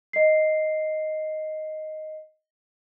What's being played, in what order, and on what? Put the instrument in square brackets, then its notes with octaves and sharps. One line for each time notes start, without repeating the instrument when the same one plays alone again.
[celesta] D#5 C7